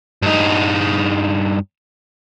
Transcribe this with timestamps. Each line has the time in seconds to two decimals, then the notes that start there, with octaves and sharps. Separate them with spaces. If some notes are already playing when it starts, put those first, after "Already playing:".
0.22 G2 D#4